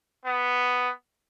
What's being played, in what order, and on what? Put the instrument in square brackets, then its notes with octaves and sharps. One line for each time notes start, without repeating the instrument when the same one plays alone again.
[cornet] B3